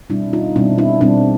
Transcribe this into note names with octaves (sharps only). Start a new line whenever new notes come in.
B2 G3 C4 D4 E4
D#4 F4
B2 G3 C4 D4 E4
D4 E4
B2 G3 C4 D4 E4